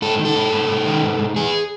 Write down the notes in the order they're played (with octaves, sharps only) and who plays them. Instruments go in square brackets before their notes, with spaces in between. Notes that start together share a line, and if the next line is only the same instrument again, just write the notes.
[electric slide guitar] G#2 A4
D#3
A4
G#2
G#2
G#2
D#3
G#2
G#2
E2 G#4